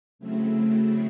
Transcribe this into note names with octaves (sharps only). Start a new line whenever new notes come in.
C#3 F#3 A3 C4 E4